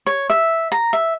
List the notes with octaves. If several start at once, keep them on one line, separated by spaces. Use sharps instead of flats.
C#5
E5
A#5
E5